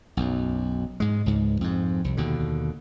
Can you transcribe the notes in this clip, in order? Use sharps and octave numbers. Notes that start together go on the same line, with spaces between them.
B1 F#2
G#2 G#3
C#2 G#2
F2 G#2
C2
D#2 B2 D3